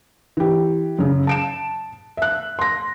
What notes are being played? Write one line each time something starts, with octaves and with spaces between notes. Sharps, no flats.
E3 G4
F#2 C#3
A5 D7 E7
E5 F#6
C6 A#6